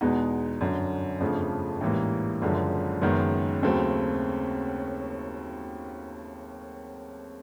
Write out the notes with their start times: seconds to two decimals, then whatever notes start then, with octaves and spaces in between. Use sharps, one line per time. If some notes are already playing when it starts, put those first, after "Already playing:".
0.01 E2 B2 G#3 B3 D#4
0.61 G1 F#2 D3
1.21 G1 F2 C#3 F3 A3
1.81 A1 G#2 E3 G3 A#3
2.42 F#1 F#2 D3 F3 G#3
3.02 F#1 F#2 D#3 G#3 B3
3.63 D#2 C#3 F#3 A3 C4